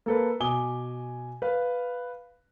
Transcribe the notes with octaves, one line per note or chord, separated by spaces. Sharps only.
A#3 A4 B4
B2 G#5 D6 D#6 G7
B4 F5